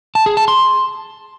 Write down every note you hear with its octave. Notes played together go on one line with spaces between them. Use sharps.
A5
G#4
A5
C6